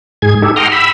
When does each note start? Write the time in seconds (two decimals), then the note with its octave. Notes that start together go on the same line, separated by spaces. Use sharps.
0.22 G#2 G#4 G#6
0.42 D#4 G4 A4
0.56 F#5 G5 A#5 C6 D#6 F6
0.72 B5 E6